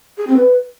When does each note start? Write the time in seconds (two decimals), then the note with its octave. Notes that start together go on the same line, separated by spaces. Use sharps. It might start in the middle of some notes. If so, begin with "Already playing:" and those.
0.17 G#4
0.27 C4
0.37 B4